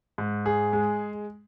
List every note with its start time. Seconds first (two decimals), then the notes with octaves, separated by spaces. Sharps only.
0.18 G#2
0.46 G#4
0.73 G#3